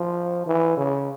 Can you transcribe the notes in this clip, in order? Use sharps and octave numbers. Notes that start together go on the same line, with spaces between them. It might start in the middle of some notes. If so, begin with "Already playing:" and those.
Already playing: F3
E3
C#3